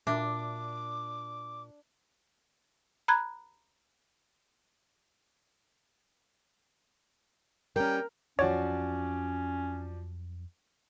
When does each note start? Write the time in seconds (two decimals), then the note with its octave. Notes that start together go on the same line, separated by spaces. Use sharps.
0.07 A#2 D4 F#4 A#4 E5 D6
3.08 A#5 B5 F#6 G#6
7.76 G3 C#4 A#4 G5
8.39 F2 F3 F#3 C#4 F#4 C#5 D5